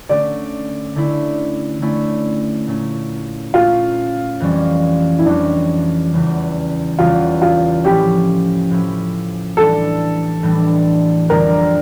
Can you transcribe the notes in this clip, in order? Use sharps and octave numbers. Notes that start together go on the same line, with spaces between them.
D3 A3 C#4 D5
D3 A3 C#4 E4
D3 A3 C#4 E4
A#2 A3 C#4
A#2 A3 C#4 F4
F2 E3 G3 C#4
E4
F2 E3 G3 C#4 D4
E2 C#3 E3 G3 C#4
E2 C#3 E3 G3 C#4 F4
F4
A2 F3 C#4 E4 G4
A2 F3 C#4 E4
A2 E3 G3 D4 A4
A2 E3 G3 D4
F2 D3 G3 D4 A#4